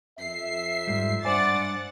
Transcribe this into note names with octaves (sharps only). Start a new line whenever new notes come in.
F2 E5 C7
G#2 G3
G2 C5 D5 F#5 G#5 A6